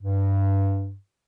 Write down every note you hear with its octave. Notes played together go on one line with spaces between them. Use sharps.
G2